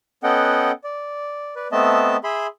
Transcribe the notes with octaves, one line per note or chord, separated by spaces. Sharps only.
B3 C#4 A4 D#5 F#5 G5
D5
B4 D5
A3 B3 C4 D#5 E5 A5
G#4 E5 B5 C6